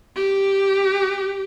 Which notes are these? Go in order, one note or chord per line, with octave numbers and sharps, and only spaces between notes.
G4